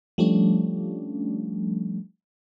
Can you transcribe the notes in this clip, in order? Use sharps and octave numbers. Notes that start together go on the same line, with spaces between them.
F3 G3 A3 C#4 D4